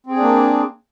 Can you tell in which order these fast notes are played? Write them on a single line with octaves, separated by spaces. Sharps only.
C4 G#4 D4 A#3